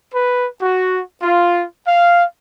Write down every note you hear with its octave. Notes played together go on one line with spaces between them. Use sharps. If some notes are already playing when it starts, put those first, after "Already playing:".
B4
F#4
F4
F5